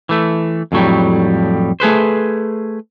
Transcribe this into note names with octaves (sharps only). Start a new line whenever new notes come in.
E3 A3
F2 A2 F#3 G3
A3 G#4 B4 C5